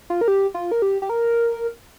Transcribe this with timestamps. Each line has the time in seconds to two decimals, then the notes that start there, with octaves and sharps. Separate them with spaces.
0.10 F4
0.21 A#4
0.28 G4
0.54 F4
0.72 A#4
0.82 G4
1.02 G4
1.10 A#4